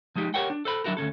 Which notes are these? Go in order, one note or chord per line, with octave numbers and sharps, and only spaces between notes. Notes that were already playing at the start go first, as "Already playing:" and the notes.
F3 G#3 D#4 G4
G4 A#4 C#5 F#5 G5
D4
A4 C5 B5
F#3 D4 E4 F#4 A#4
D2 B2 C#4 A4